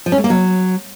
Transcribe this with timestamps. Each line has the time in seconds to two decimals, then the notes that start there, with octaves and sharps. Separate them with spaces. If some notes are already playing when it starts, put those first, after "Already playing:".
0.06 F3
0.12 C#4
0.18 A3
0.24 A#3
0.30 F#3